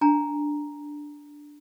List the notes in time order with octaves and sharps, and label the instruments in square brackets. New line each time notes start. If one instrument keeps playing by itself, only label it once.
[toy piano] D4 G#5 A#5